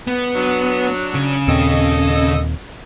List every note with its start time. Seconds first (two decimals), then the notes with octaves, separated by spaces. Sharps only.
0.07 B3
0.35 F#3 D4
1.14 C#3
1.48 D#2 A#2 C4 A4 D#5